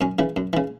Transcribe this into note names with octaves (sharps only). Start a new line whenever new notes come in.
F#2 C#4
C#3 E3
F#2
C#3 E3